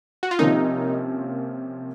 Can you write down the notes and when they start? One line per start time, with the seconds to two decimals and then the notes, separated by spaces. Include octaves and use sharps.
0.23 F#4
0.31 F4
0.39 C3 F3 A#3 C#4 D#4